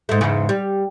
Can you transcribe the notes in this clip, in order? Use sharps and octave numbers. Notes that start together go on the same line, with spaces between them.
G#2 A3
E2 G#2 C#3
G3